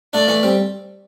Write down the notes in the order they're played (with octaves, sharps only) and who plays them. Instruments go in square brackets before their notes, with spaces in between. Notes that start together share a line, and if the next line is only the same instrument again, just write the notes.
[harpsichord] A3 D4 [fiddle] D5
[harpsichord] E3 A3
G3 C4